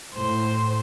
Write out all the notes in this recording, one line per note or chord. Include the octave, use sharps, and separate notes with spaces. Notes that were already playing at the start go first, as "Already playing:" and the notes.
A2 C5